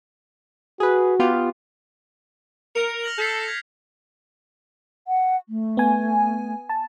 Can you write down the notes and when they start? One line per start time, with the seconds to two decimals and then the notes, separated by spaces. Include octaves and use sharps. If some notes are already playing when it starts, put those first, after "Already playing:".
0.80 F#4 G#4 B4
1.19 B3 F4 G4
2.75 A#4 C#7 F7
3.03 F6 A#6 F#7
3.18 A4 G6 B6 C7
3.48 G#6
5.08 F#5
5.49 A3
5.77 B3 G#5
6.69 A5